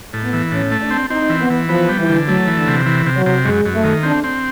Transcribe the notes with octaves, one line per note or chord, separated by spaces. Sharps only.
A2
B3
E3
A2 C#4
A3
D4
C4
C4 D#4
E3
B3
E3
F3 B3
G3
E3
D3
F#3 A3
E3
D3
C3
E3
C3
F#3
C3
F#2 G#3
F#2
A3
D#3
C4 D4
C4